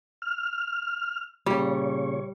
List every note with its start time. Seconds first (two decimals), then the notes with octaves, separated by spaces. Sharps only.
0.22 F6
1.46 A#2 C#3 G3 C#5